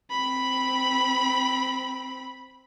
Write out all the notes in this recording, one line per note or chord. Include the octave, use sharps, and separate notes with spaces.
C4 B5